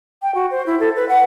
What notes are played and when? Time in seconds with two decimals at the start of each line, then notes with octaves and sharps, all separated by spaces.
0.22 G5
0.35 F#4
0.51 C5
0.66 E4
0.80 A4
0.96 B4
1.09 F#5